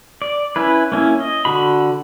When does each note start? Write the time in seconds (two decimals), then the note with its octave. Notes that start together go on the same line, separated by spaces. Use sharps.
0.22 D5
0.56 C#4 E4 B4
0.92 A#3 C#4 E4
1.20 D#5
1.45 D3 F#4 B5